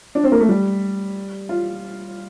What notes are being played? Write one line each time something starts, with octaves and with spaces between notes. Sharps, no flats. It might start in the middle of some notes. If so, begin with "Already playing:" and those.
D4
C4
A#3
A3
G3
F4